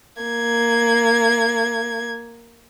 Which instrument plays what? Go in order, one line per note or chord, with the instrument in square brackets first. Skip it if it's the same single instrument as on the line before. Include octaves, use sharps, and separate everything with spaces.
[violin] A#3 G#6